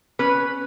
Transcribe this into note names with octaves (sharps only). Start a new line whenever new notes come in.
C#4 B4